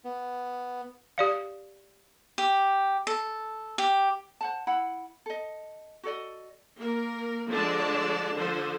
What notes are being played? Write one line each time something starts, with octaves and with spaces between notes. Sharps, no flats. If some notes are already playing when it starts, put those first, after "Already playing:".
B3
G4 D5 F5
G4
A4
G4
C5 F#5 A5
E4 F#5 B5
A4 D#5
F#4 A4 D5 D#5
A#3 A#4
D3 F3 G#3 D4 D5 A5
D3 F3 A4 C5